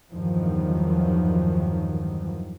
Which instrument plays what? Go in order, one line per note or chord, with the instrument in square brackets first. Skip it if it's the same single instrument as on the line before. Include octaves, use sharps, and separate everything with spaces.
[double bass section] E2 G2 D#3 F3 F#3